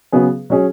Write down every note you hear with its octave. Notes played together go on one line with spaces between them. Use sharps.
C#3 F#3 B3 G#4
F#3 C#4 G#4